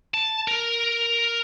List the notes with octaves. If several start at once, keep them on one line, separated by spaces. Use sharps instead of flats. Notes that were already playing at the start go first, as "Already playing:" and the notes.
A5
A#4